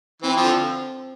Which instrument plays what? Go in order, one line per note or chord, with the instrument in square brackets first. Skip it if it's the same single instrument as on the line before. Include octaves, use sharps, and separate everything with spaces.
[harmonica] E3 [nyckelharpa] C4
[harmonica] F3
D3